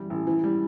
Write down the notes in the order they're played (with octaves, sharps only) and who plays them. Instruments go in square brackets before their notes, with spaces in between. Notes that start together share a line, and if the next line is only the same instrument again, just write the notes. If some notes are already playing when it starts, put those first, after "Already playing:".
Already playing: [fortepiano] E2 E3 G3
A1
E3
G3